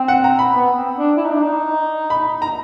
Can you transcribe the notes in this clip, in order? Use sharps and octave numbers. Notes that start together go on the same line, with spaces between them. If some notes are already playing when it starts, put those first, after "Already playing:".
Already playing: C4
F#5
A#5
B5
B3
C4
D4
E4
D#4
D4
D#4
B5
A#5